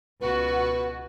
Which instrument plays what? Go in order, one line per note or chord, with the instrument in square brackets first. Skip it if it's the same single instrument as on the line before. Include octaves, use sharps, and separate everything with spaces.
[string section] C#2 B2 F#4 [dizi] B4